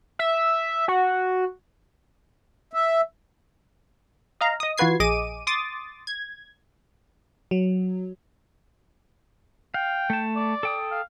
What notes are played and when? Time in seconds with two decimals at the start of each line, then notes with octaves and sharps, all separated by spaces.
0.19 E5
0.88 F#4
2.73 E5
4.41 D#5 F5 A#5
4.60 D#5 D#6
4.78 E3 F4 F#4 B4 G#6 C7
5.00 A#1 G#4 D#5 D6 D#7
5.47 C6 D6 D#6 A6
6.07 G#6
7.51 F#3
9.74 F5 G5
10.10 A3 A5
10.36 D5
10.63 A4 G5 D#6
10.92 F5